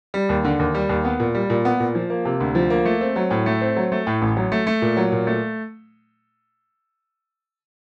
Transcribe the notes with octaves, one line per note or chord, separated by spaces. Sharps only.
G3
D#2
D3
D#2
G3
D#2
B3
A#2
G3
A#2
B3
A#2
F3
A#3
C3
D2
F3
A#3
A3
C4
F#3
A2
A3
C4
F#3
A3
A2
A1
F#3
A3
A3
A#2
F#3
A#2
A3